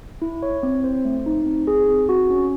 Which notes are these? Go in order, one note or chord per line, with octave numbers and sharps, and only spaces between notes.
E4
C#5
C4
C5
A3
D#4
C4
G#4
C4
F#4
C#4